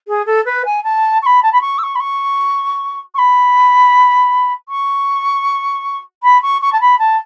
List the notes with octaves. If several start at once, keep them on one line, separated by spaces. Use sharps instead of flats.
G#4
A4
B4
G#5
A5
C#6
B5
A5
B5
C#6
E6
C#6
B5
C#6
C#6
B5
C#6
B5
C#6
C#6
A5
B5
A5